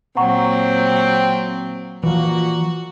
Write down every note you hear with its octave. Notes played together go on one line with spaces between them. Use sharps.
A#2 F#3 C4 F#5 A#5 C#6
A#2 E3 F3 F#4